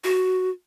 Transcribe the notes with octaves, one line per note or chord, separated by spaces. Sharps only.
F#4